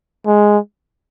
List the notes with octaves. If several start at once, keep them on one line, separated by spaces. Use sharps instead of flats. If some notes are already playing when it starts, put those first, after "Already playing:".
G#3